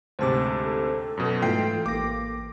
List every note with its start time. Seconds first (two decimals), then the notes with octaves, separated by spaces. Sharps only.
0.19 D2 G#2 C3 C5 A5 D6
0.64 A4
1.17 F#2 B2
1.42 G#2 E3 A3 F4 G5 C7
1.86 A1 A#3 D6 A#6